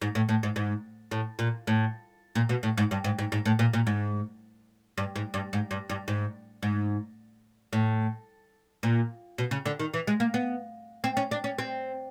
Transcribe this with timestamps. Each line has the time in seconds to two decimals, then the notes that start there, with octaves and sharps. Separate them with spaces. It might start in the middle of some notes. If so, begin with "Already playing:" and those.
0.02 G#2
0.15 A2
0.29 A2
0.43 G#2
0.56 G#2
1.11 A2
1.39 A#2
1.67 A2
2.35 A#2
2.49 B2
2.63 A2
2.77 G#2
2.91 G2
3.04 G#2
3.19 G#2
3.32 G#2
3.46 A2
3.59 A#2
3.73 A#2
3.87 G#2
4.98 G2
5.16 G#2
5.34 G2
5.53 G#2
5.71 G2
5.89 G2
6.08 G#2
6.63 G#2
7.73 A2
8.83 A#2
9.38 B2
9.51 C#3
9.66 D3
9.79 D#3
9.94 E3
10.07 G#3
10.20 A#3
10.34 B3
11.04 C4
11.17 C#4
11.31 D4
11.44 C#4
11.58 C4